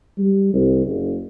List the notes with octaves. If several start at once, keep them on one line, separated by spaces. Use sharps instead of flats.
G3
C2
F#1